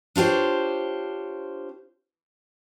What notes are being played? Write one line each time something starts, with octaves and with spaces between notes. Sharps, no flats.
D4 F4 G4 C5 C#5